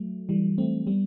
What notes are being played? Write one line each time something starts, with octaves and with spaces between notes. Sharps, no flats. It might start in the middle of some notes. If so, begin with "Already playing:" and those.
Already playing: F#3 A3
E3 G3
A3 C4
G3 B3